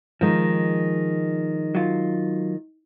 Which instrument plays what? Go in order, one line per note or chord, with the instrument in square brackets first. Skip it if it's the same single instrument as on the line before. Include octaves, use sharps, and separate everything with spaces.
[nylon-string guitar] D#3 G#3 [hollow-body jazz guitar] F3
[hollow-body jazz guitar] F#3 F4